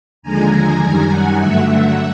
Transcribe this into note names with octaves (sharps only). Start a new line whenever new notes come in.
D#2 D3 F3 G#3 G#5 A#5
F#2 D#3 G3
F#5 G#5
G2 D3 F#3 A3 E5 F#5
E5 F#5